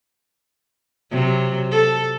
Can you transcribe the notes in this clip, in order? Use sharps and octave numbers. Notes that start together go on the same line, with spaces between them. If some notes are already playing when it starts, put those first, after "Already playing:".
C3 F#3
A4